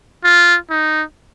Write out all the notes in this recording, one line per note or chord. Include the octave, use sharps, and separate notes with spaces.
F4
D#4